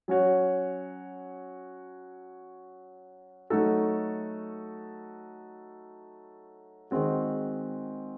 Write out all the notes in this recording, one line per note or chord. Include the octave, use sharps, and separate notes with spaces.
F#3 C#4 F#4 C#5
F#3 A3 D#4 F#4 A4
D#3 G#3 C4 F#4